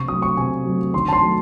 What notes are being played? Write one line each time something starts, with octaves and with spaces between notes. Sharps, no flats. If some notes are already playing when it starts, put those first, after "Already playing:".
Already playing: C3 C#6
F#3 A3 D#6
C#6
C3 G#5
F#3 A3
D#3 C6
A5
C6
F#3 A3